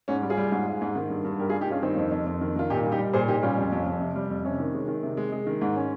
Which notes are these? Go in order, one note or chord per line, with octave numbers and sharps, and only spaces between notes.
G#2 C#4
G3
F4 G#4
G3
G#2
G#2
G#2
D#3
G2
G2
G3 G4 A#4
F4 G#4
G3
D#4 G4
G2 C#4 F4
D#3 C4 D#4
F2
F2
F2
D#3
D#3 F4
A#2 D#4 G4
G3
D#4 G4
G3
A#2 G#4 C5
A#2 D#4 G4
G3 C#4 F4
F2
F2
F2
C3
G3
F2
C3 C#4
D#3
G#3
D#3
C3
G#3
G#3
D#3
G#2
C#4